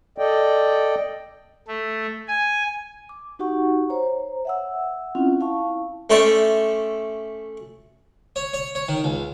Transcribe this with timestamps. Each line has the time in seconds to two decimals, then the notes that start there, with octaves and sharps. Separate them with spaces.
0.18 A4 D5 D#5 G5
1.68 A3
2.28 G#5
3.09 D6
3.39 D#4 F#4 G4 F#5 C#6
3.89 C5 C#5 A#5
4.45 E5 F#5 E6
5.15 C4 C#4 E4 F4 F#5
5.40 E4 F5 A5 C#6
6.10 A3 C#4 A4 C5 D5 E5
8.36 C#5
8.54 C#5
8.75 C#5
8.89 D#3
9.04 C#2